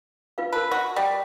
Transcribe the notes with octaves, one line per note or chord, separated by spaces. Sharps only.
F4 B4 F5
A#4 B4 A5
F#4
G3